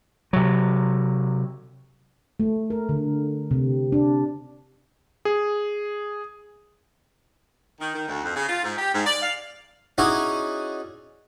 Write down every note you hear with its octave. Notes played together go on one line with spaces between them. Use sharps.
C3 F#3
A3
A#4
D3
C3
D4
G#4
D#3
D#3
D2
F2
C#3
F4
G#2
G4
G#2
D5
F5
C#4 D#4 E4 F#4 G#4 D5